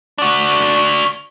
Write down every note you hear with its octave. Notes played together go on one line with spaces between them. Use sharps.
D4 F#4